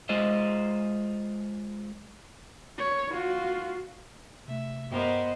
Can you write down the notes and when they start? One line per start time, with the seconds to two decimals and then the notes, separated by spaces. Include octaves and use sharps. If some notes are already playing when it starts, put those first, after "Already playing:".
0.09 G#3 F4 C5 D#5
2.79 C#5
3.12 F4 F#4
4.48 C3 A3 E5
4.91 G2 B3 G4 A#4 C5 D#5